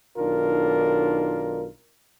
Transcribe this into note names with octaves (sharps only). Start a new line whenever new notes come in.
B1 D#3 D4 F4 A#4